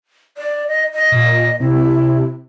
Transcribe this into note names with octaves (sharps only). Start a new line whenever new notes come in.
D5
D#5
D#5
A#2
C3 E4